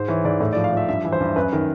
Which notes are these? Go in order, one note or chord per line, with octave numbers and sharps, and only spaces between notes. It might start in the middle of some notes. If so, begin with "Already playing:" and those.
Already playing: G#2 C5
E3 C#5
G#2 D5
A2 D5
F3 D5
F5
F3 E5
G2 E5
E3
C5
G2
F#2 B4
D#3